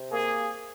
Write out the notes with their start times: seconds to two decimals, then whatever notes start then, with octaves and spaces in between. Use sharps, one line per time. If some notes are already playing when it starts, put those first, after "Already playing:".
Already playing: C3
0.11 A#3 G#4